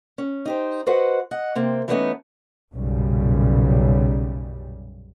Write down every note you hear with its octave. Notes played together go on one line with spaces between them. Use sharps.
C#4
D#4 G4 C5
F#4 B4 C5 D#5 F#5
D#5 F#5
C3 A#3 C4
E3 G3 A3 B3 C#4 D#4
B1 F#2 A#2 C#3 G3